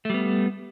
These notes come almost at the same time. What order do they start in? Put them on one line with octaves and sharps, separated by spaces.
A3 G3 B3